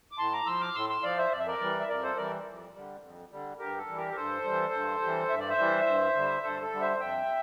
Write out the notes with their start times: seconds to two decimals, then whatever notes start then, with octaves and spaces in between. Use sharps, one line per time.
0.12 D6
0.18 A2 A5 C6
0.33 A#5 D6
0.46 F3 C6 E6
0.61 D6 F6
0.75 A2 C6 E6
0.89 C6 E6
1.03 F3 D5 F5
1.18 C5 E5
1.32 F2 D5
1.39 E5
1.47 A#4 D5
1.60 E3 G3
1.79 E5
1.88 F2 A#4 D5
2.03 A4 C5
2.17 E3 G3 A#4 D5
2.46 F2
2.74 D3 G3
3.02 F2
3.31 D3 G3
3.59 G2 G4 A#4
3.78 A4
3.88 E3 G3
3.97 G4 A#4
4.11 A#4
4.16 G2 A4 C5
4.44 E3 G3
4.73 G2
5.02 E3 G3
5.29 G2 E5
5.39 D5
5.49 C5 E5
5.58 E3 G3
5.86 G2
6.15 D3 G3
6.43 G2 A4 C5
6.62 A4
6.71 D3 G3
6.81 C5 E5
6.99 F2 E5 G5